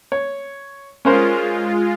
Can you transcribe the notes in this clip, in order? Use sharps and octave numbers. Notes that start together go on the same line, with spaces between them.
C#5
G#3 C#4 F4 A#4 C5